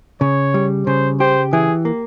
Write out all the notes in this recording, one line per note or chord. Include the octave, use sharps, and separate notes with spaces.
C#3 C#5
G3
C#3 C5
G4 C5
E3 G#4
A#3